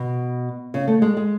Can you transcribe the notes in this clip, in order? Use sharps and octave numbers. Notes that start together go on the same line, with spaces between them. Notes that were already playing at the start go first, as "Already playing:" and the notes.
Already playing: B2
C#3
A3
G#3
G#3